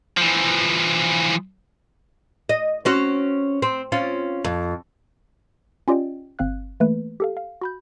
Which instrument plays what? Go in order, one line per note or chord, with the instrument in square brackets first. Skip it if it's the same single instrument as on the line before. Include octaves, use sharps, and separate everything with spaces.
[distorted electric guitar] E3 F3
[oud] D#5
C4 C#4 F#4
C4
C4 C#4 F4
F2
[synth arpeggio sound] C#4 F4 G4 D5 D#5 G5
G1 C4 F5 F#6
E3 A3 A#3 B4
G4 A4 F5
F5
F#4 B5 G6